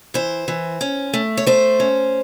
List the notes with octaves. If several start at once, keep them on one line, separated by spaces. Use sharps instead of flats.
E3 C5
E3
C#4
A3
C#5
A3 C5
C#4